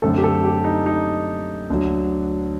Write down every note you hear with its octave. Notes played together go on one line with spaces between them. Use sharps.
F#2 D3 A3 C4 A4
G4
A4
G4
D#4
D#4
D2 D3 F#3